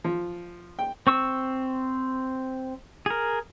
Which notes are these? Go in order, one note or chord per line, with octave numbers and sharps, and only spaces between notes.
F3
G5
C4 C#6 E6
G#4 A#4